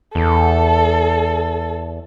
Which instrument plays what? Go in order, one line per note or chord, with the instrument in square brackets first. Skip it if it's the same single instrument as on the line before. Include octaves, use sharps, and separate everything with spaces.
[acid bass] E2 [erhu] A4